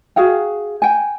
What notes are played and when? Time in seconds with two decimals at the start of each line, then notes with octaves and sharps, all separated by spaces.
0.16 F#4 G#4 F5 G5
0.82 G5 G#5